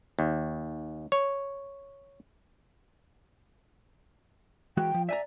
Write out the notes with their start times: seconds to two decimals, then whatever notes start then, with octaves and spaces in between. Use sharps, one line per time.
0.19 D#2
1.12 C#5
4.77 E3 G#3 F#4 G5
4.94 F3
5.09 D5 E5 G#5 A#5